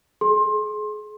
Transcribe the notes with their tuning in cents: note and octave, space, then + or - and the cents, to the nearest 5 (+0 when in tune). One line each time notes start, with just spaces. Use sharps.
G#4 +35 C6 +25